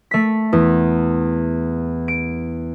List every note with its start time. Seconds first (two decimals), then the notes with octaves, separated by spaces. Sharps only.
0.11 A3 B6
0.53 E2
2.08 D7